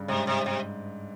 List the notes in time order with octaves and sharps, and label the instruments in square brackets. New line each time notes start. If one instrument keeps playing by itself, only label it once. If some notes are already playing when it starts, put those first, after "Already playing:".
Already playing: [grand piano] G2 C#3
[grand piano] G#2 [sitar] C3
[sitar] C3
C3